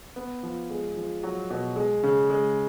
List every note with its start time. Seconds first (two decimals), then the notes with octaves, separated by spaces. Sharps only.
0.16 B3
0.43 F3
0.70 G#3
0.97 F3
1.23 F#3
1.50 B2
1.76 G#3
2.03 C#3
2.30 G#3